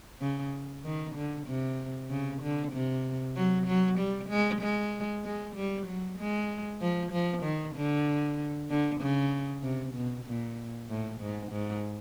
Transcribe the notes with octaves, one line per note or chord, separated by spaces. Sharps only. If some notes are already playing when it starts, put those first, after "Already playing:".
C#3
D#3
D3
C3
C#3
D3
C3
F#3
F#3
G3
G#3
G#3
G#3
G3
F#3
G#3
F3
F3
D#3
D3
D3
C#3
C3
B2
A#2
A2
G#2
G#2